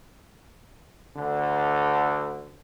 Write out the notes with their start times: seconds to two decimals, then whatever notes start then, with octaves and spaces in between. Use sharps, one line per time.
1.15 D2 D3